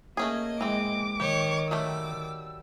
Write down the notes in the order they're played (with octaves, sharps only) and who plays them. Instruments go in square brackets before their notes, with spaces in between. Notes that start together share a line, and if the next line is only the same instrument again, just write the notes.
[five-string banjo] A3 C#4 G#4 [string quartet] A#3 D#5
[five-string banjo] E3 C4 [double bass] G#3 [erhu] D6
[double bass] D#3 [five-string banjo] G4 [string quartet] C#5 D#5
[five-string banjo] F#3 G3 A3 [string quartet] D6 [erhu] E6